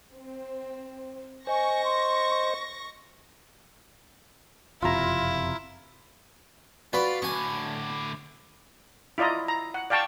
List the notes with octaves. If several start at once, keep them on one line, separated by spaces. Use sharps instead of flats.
C4
C5 D#5 G#5 C#6 A#6
C6
F#1 F2 C3 E4 F4 A#5
F4 F#4 B4 D5 B5
A2 D3 G#5 C#6
E4 F4 D5 D#5 A#5
A#5
F#5
D5 F5 G5 A5 C#6